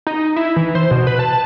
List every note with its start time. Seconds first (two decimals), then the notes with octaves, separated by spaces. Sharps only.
0.07 D#4
0.36 E4
0.56 E3
0.75 C5
0.91 B2
1.07 B4
1.19 A5